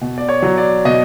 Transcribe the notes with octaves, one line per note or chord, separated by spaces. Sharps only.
B2
D5
C#5
F#3
D5
B2 D#5